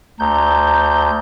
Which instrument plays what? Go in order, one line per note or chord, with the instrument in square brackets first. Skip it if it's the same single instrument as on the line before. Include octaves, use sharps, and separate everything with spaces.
[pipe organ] D2 G6 [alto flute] A#5